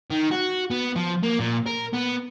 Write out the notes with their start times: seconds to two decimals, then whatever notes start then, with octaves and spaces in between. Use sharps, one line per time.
0.11 D#3
0.31 F#4
0.71 B3
0.96 F3
1.23 A#3
1.40 A#2
1.66 A#4
1.93 B3